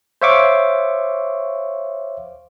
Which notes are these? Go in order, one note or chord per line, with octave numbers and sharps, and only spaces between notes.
C5 C#5 E5 F5 C#6 D6